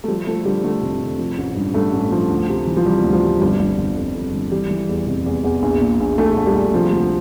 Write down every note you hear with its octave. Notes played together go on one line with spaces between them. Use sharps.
A3
F3 G3
F3 A3
D3 G3
D3 A3
F1
F1
F3
A1
G2
G2 A3
A1
F3
D2
C3
E3
F3
C3 G3
D2
F3
C3
G1 G3
G1
G1
F2
F2
G1
E3 G3
E3
E2
F1
E2
E2
A#1
A#2
A#1
A#1 A3
A#1
G3
A#1
C3 F3
D2